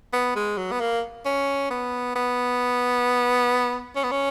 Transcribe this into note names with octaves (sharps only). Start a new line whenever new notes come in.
B3
G#3
F#3
B3
A#3
C#4
B3
B3
C#4
B3
C#4